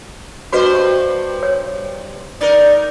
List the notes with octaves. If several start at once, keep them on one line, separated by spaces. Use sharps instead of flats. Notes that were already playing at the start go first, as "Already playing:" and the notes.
G2 F#4 B4 C5 D#5
C#5
D#4 A#4 D5